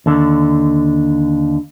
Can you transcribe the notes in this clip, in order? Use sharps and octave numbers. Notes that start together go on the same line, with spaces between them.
D#2 D3